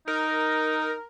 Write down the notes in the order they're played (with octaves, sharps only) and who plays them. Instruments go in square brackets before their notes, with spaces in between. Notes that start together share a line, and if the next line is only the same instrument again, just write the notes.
[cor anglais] D#4 [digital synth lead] A#4